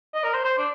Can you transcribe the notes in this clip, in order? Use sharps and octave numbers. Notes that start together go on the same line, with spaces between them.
D#5
A#4
C5
C5
D4